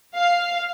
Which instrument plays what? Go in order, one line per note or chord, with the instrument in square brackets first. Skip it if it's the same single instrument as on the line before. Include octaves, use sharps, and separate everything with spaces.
[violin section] F5